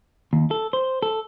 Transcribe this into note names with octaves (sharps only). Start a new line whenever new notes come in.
D#2
A4
C5
A4